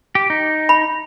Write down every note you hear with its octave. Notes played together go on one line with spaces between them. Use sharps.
G4
D#4
B5